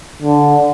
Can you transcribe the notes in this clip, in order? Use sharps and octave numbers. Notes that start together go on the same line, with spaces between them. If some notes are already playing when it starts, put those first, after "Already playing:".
D3